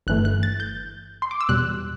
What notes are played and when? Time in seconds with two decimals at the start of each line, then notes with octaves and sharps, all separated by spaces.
0.07 G1 G2 E3 A3 F#6
0.25 F#6
0.43 A6
0.60 G6
1.22 C6
1.31 D6
1.41 E6
1.49 E2 B2 G3 F#6